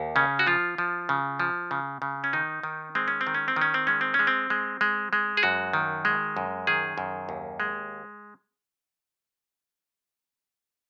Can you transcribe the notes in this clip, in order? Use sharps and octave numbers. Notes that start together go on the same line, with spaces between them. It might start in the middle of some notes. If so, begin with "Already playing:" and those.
Already playing: D#2
C#3 C#4
F#4
F3 F4
F3
C#3
F3
C#3
C#3
C#4
D#3 D#4
D#3
G#3 C4
C#4
C4
D#3
C#4
C4
D#3
C#4
C4
G#3 C#4
C4
C#4
G#3
C4
G#3
G#3
G#3
G#4
F#2 F#4
D#3
G#3
F#2
D#3 G#4
F#2
D#2
G#3